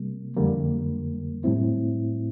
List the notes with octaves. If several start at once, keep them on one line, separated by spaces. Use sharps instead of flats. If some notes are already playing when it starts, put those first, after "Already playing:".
Already playing: C3 G3 A#3
F2 D3 G3 A#3
A2 G3 C4 E4